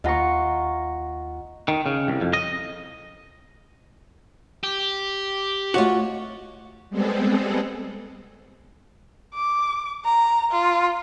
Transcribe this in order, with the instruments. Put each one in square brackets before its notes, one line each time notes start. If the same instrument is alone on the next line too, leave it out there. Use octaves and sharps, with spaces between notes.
[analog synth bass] D#2 [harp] F4 A#5 C#6 [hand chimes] D#5 F#5
[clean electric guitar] D#3
C#3
C2
F2
D#5
[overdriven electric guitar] G4
[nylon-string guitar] A3 C#5 D#5 [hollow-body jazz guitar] F4 F#4
[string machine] G3 G#3 B3 C4 G#4 A4
[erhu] D6
A#5
F4